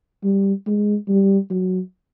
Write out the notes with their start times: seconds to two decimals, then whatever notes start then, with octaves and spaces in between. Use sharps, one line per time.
0.24 G3
0.67 G#3
1.09 G3
1.50 F#3